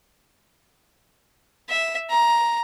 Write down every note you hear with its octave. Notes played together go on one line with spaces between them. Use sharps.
E5
A#5